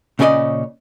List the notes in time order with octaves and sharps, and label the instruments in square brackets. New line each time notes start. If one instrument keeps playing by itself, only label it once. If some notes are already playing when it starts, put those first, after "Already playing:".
[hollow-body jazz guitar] A#2 C#3 C#4 G#4 D5 D#5